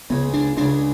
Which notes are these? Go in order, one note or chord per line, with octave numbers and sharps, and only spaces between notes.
C#2 C#3 G#3 B3
D4
C#2 C#3 G#3 D4